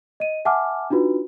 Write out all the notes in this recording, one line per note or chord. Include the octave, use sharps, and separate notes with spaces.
D#5 D#7
E5 F#5 G#5 A5 D6 F6
D4 D#4 F4 F#4 B4